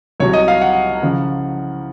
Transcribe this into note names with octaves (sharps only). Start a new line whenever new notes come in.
C2 C3 F#3 C#5
D#5
F5
F#5
C#3 F3